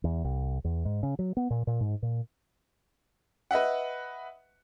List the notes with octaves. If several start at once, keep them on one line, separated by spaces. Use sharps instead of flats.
E2
C2
E2
G#2
C#3
F#3
B3
A#2
A#2
G#2
A#2
B4 D#5 E5 F#5